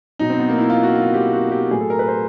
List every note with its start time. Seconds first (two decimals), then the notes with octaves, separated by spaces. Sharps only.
0.19 B2 F#3 D#4
0.30 C4
0.39 B3
0.49 A#3
0.58 E4
0.70 F4
0.83 F#4
0.95 F4
1.14 G4
1.33 F#4
1.52 G4
1.71 A2 F#3 G#4
1.81 A4
1.90 A#4
1.99 B4
2.08 C5